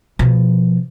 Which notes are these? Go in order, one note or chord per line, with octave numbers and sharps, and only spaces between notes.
B2 F3